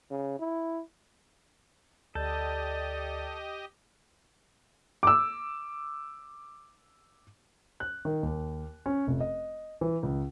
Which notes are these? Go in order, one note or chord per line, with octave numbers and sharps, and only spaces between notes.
C#3
E4
D2 G4 A4 D5 D#5 G6
D6 E6
F#6
D#3
D#2
C#4
F1
D#5
E3
C#2